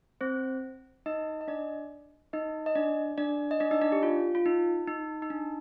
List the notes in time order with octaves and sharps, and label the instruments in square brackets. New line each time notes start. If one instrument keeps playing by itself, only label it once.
[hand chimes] C4 C5
D#4 D#5
D#5
D4 D5
D#4 D#5
D#5
D4 D5
D4 D5
D#5
D4 D5
D#4 D#5
D4 D5
G4
F4
F4
D#4
D#4
D#4
D4